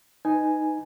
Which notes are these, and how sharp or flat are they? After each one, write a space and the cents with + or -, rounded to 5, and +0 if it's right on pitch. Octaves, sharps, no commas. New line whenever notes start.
D#4 +0 B4 +25 G#5 +0